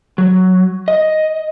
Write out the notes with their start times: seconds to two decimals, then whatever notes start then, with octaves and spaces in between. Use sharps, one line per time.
0.18 F#3
0.88 D#5